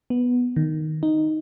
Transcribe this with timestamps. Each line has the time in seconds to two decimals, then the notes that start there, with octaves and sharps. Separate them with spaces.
0.10 B3
0.56 D#3
1.03 D#4